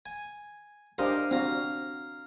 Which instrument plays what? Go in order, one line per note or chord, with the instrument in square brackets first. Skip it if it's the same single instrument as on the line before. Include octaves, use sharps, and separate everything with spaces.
[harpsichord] G#5
[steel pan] D4 G4 A#4 [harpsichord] C5 D#5 F5
[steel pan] C4 D4 F#4 [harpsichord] F5 A#5